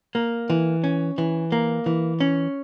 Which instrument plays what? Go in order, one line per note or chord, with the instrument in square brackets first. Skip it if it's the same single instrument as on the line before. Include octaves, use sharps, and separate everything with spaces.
[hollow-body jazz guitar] A#3
E3
C#4
E3
A#3
E3
C#4